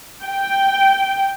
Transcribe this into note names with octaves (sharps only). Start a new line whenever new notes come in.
G5